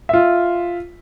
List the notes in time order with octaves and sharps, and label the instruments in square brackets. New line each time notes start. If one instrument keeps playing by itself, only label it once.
[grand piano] F4 E5